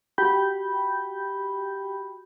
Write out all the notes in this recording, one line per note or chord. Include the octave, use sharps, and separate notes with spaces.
F#4 G4 G5 B5 G6